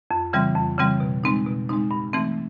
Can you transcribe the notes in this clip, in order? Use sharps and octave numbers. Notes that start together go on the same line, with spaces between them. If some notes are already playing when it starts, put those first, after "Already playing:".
F2
C#3 E3 G3 C4
F2
C#3 E3 G3 C4
B2
G#3 C4 D#4
B2
G#3 C4 D#4
G2
E3 A3 C4